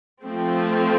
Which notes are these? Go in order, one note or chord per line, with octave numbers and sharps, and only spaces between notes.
F3 A3 C4